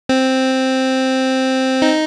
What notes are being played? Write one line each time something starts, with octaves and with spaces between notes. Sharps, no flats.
C4
D#4